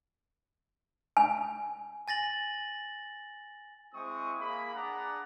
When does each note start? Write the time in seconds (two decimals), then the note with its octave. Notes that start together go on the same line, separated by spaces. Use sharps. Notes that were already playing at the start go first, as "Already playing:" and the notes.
1.17 G#5
2.08 G#5 A6 A#6 F#7
3.93 G#3 C4 E4 C#6 D#6
4.39 A#3 G#4 B5
4.74 D4 G#4 D5 F#5 A#5